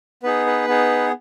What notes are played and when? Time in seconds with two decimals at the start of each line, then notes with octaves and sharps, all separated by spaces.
0.23 B3 D#4 G#4 B4
0.46 B4
0.68 B3 D#4 G#4